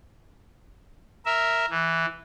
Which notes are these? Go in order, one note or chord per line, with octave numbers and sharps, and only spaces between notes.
A#4 E5
E3